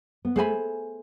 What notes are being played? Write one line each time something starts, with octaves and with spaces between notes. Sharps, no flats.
B3
A3 G#4 C5 G#5 B5